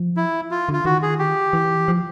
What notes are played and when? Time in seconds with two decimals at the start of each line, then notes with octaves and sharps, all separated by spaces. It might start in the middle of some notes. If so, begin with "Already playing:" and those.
Already playing: F3
0.17 E4
0.51 F4
0.69 D3 F4
0.85 D#3 F#4
1.02 G#4
1.19 G4
1.53 E3
1.88 F3